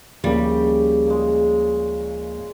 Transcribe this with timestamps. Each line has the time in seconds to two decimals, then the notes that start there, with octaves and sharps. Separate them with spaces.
0.24 D2 C#3 F3 G3 A#3 G5
1.06 A#2 G#3